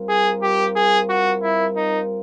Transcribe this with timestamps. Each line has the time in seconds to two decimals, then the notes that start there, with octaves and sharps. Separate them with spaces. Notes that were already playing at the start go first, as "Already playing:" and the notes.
Already playing: G3 C4 F4 A#4
0.09 G#4
0.43 G4
0.76 G#4
1.09 F#4
1.42 E4
1.76 D#4